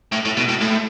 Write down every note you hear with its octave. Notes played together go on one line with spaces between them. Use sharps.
A2
A2
B2
A2
A2